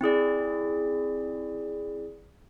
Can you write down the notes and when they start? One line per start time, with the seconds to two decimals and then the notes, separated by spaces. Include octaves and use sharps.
0.01 C4 E4 G#4 D5